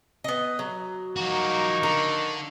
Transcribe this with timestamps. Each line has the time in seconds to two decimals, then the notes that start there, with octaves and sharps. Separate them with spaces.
0.24 B3 D#5
0.59 F#3
1.16 F3 A#3 D#4 F#4 C#6
1.83 D3 A#4